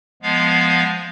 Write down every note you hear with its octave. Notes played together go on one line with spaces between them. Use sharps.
F3 G#3 B3 F5